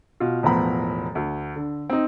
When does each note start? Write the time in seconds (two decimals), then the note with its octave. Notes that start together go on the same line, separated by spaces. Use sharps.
0.20 B2 F4
0.43 E1 A2 F3 B3 A#5 B5
1.15 D2
1.56 D3
1.90 C4 D#4